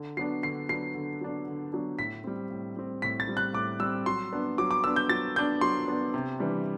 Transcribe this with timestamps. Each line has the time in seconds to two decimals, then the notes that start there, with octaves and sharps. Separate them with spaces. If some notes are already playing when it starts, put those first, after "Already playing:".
Already playing: D3
0.17 F#3 B3 D4 C7
0.43 D3 C7
0.69 F#3 B3 D4 C7
0.95 D3
1.21 F#3 B3 D4
1.47 D3
1.73 F#3 B3 D4
1.99 A2 B6
2.24 G3 C4
2.51 A2
2.76 G3 C4
3.02 A2 B6
3.20 A6
3.28 G3 C4
3.37 F#6
3.54 A2 D6
3.80 G3 C4 E6
4.06 F#3 C6
4.33 B3 D4
4.58 F#3 D6
4.71 D6
4.84 B3 D4 E6
4.96 G6
5.09 F#3 A6
5.36 B3 D4 G6
5.61 F#3 C6
5.88 B3 D4
6.14 C3
6.39 E3 G3 D4